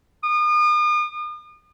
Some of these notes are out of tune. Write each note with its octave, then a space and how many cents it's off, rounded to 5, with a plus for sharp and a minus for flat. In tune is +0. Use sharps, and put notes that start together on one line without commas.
D#6 -40